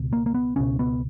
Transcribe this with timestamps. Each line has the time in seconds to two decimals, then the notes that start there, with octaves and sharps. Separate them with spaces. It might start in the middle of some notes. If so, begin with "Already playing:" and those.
Already playing: C#2 B2
0.13 A#3
0.26 A#3
0.34 B3
0.56 C#2 B2 C#4
0.79 B3